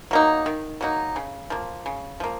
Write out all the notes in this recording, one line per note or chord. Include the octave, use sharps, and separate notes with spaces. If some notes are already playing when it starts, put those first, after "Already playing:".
F#3 A#3 D#4
D#3
F#3 A#3 D#4
C#3
F3 A#3
C#3
F3 A#3